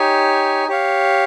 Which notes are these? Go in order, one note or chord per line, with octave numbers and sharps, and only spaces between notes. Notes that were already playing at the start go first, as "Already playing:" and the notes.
Already playing: D#4 G4 C#5 G#5
G4 C#5 F5